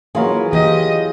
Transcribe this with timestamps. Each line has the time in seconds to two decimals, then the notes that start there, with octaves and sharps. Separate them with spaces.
0.15 E3 F#3 A#3 F4 G#4
0.53 E3 G4 D#5